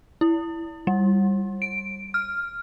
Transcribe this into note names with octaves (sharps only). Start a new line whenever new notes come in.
E4
G3
D7
F6